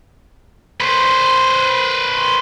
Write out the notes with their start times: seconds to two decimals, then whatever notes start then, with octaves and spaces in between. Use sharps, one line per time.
0.81 B4 C5